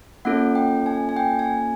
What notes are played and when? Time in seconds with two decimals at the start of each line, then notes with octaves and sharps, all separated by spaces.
0.25 A#3 C#4 F4 A4 F#5
0.55 G5
0.86 G#5
1.09 G#5
1.17 G5
1.39 G#5